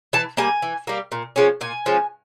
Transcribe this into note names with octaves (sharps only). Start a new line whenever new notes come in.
E3 A5
G3 A#3 G#5
E3
G3 A#3
A#2
F3 G#3 C#4
A#2 G#5
F3 G#3 C#4